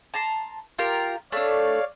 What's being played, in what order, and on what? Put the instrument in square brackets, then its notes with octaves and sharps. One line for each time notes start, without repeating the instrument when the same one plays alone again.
[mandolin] A5 A#5 C6
F4 G4 A#4
[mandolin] A3 D4 [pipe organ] C#5 D5 F5